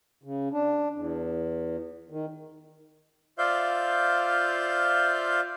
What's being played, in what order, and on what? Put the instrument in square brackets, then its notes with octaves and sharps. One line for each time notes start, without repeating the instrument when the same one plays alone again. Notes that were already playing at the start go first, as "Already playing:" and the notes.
[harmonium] C#3
D4
E2
D#3
[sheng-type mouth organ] F4 C5 D5 E5 F5 G6